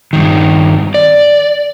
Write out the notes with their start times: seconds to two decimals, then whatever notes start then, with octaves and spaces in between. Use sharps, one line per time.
0.13 G2 D#3
0.94 D5